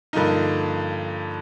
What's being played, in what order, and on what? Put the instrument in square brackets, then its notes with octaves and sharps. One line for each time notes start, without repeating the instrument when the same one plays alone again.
[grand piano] G2 D3 F3 A#3 D#4